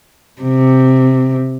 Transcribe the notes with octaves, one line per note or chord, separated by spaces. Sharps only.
C3